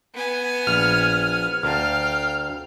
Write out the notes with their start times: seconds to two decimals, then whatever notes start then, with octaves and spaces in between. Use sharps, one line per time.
0.14 B3 G#5
0.67 A#1 F6
1.63 D2 A#4 F5 G5 A5